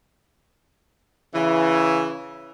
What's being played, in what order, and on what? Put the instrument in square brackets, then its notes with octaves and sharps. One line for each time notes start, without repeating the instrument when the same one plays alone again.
[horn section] C#3 E3